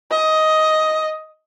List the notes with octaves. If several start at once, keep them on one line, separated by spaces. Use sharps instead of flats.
D#5